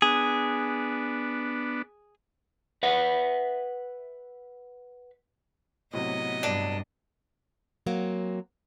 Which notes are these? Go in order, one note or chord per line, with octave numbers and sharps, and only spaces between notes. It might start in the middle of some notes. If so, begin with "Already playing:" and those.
B3 D4 G#4
B4 E5 F#5
A2 C3 F#3 B3 D#5
G2 D4
F#3 A#3 C4